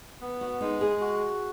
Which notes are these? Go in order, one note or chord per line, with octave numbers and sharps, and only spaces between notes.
B3
F#4
G#3 D#4
G#4
F#4